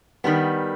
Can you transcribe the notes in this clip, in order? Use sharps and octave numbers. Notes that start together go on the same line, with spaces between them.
D#3 G3 B3